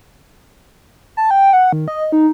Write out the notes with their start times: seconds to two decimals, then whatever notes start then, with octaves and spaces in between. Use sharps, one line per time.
1.17 A5
1.31 G5
1.53 F#5
1.73 D#3
1.88 D#5
2.12 D#4